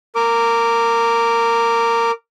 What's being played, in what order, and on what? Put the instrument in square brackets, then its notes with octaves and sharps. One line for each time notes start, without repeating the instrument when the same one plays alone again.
[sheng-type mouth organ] A#4 D6